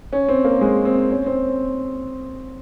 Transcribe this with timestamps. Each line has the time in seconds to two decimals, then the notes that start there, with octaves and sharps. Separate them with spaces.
0.13 C#4
0.29 C4
0.44 A#3
0.61 G#3
0.85 C4
1.10 C#4
1.26 C4